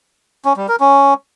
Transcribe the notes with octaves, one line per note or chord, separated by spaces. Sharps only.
C#4
G3
A#4
C#4